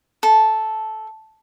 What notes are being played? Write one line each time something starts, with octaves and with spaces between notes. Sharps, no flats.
A4